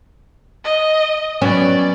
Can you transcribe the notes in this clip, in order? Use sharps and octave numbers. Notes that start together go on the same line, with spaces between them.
D#5
F#3 B3 C#4 D5